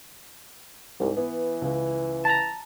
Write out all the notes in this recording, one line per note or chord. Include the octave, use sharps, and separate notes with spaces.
C2 G#2
E3 B3
C#2
A5 A#5